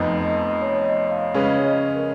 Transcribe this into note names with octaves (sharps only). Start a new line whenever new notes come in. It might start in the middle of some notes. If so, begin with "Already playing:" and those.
Already playing: F1 F2 F3 B3 D#4 D#5
D#5
C#5
C#5
D#5
F5
C#3 G#3 C#4 G#4 B4 F5
D#5
C#5
D#5
A#4